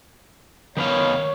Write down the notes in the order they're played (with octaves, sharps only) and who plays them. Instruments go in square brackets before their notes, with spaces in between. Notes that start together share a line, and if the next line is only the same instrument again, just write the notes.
[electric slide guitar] D#3 B3 F5 [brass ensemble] C#5